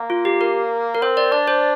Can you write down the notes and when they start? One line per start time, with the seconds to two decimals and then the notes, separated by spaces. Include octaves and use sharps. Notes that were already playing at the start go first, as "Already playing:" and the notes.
Already playing: A#3
0.10 F4
0.25 G4
0.41 A#4
0.95 A#4
1.02 C4 C5
1.17 D5
1.32 D4 D5
1.47 C5